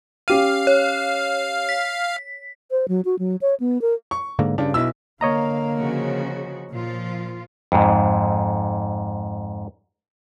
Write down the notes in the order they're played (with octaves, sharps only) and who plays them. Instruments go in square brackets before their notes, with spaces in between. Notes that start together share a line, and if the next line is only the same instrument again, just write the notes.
[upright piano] C#4 G4 D#7 [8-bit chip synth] F5
[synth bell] C#5
B6
[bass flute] C5
F#3
F#4
F#3
C#5
B3
A#4
[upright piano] C#6
[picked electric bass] G#2 D3 A#3
[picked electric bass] G2 C#3 [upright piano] D4
[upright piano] B1 E4 E6 [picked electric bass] B2
[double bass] D3 A#3 [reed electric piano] C#5 D#5 A#5 [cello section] F5
[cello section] C#3 F3 F#4
[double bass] A#2 [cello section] F3 F4
[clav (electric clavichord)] F2 G#2